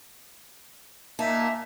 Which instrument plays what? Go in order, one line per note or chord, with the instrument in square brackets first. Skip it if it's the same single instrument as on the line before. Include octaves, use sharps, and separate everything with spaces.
[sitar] A#2 D#4 [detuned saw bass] A#3 [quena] E5 [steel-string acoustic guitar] A5